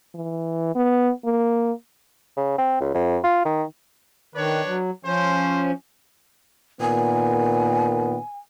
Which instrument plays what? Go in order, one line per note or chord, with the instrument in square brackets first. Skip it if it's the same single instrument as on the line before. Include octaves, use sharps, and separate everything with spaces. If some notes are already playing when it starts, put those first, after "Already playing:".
[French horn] E3
B3
A#3
[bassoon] C#3
C4
C#2
F2
F4
D#3
[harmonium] D#3 [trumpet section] D4 B4 C#5
[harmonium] F#3
[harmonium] F3 C#4 [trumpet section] C5
[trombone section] A#2 D#3 B3 [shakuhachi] G#5